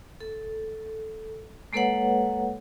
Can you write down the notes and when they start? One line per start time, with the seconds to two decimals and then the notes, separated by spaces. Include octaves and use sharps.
0.20 A4
1.73 G#3 A#3 A4 B4 C#5 F#5